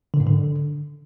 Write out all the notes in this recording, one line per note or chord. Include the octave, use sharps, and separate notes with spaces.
D3
G#2
D3